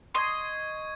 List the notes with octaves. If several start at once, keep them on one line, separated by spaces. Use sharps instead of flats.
D#5 C6 C#6 G#6